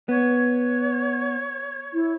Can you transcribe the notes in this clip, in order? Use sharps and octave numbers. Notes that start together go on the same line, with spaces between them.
B3 C#5
E4